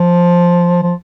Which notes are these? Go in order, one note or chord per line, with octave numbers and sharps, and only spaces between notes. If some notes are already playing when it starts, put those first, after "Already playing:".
Already playing: F3
F3